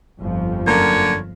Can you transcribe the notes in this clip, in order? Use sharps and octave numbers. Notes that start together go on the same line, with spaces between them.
G1 F2 F3
F#2 D3 A#3 C#5 A#5